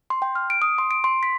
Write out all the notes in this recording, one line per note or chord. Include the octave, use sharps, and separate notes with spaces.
C6
G5
F6
D7
D#6
C6
D7
C6
B6